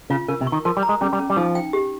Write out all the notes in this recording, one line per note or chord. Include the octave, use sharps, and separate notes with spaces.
C#3 F4
C#3 A#4
C3
C#6
D#3
F3 A#4
G3
A#5
G#3
G3 C#4
G3
C#4
G3
F3 D#4
G5
G4